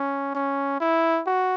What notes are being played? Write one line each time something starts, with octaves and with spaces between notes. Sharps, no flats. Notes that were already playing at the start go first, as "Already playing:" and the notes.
Already playing: C#4
C#4
E4
F#4